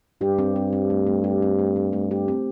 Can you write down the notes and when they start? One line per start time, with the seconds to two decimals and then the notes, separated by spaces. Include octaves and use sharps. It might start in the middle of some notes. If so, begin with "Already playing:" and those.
0.21 G2 G4
0.39 C4
0.56 C4
0.73 C4
0.90 A3
1.07 A3
1.24 G4
1.42 C4
1.59 A3
1.76 A3
1.93 A3
2.11 G4
2.28 C4